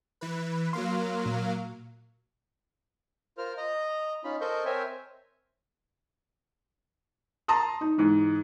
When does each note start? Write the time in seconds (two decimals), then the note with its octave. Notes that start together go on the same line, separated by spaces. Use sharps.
0.21 E3 B4
0.73 F#3 A#3 F5 C6
1.26 A#2
3.38 F4 A#4 C5 F6
3.57 D#5 A#5
4.24 C#4 D#4 F4 B5
4.41 A4 A#4 C5 D#5 C#6 G6
4.65 C4 A#4 C5 C#5 E5 G#5
7.48 A5 A#5 C6 D#6
7.81 D#4
7.98 G#2 E3